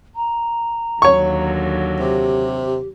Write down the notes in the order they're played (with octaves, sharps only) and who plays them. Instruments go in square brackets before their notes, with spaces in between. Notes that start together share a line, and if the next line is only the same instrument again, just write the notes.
[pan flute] A#5
[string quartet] D#2 D3 F#3 [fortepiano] C#5 C#6
[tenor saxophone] C3 [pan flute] G4